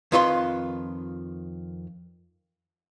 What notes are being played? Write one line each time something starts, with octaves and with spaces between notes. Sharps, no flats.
F2 D#3 F4 B4 B5 C6